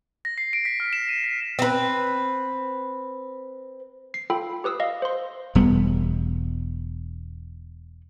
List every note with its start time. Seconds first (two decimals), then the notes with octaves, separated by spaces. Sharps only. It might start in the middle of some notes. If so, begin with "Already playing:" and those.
0.25 A#6
0.38 C7
0.53 D7
0.65 B6
0.80 F6
0.93 E7
1.09 D#7
1.24 B6
1.59 C4 B4
4.14 C7
4.30 F4 A4 G5 B5
4.64 G4 B4 D#6 E6
4.80 D#5 F5
5.02 C5 C6
5.55 E1 G3 B3